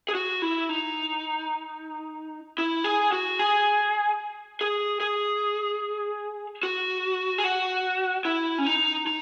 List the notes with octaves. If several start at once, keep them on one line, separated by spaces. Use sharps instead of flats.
G#4
F#4
E4
D#4
E4
G#4
F#4
G#4
G#4
G#4
F#4
G#4
F#4
E4
C#4
D#4
D#4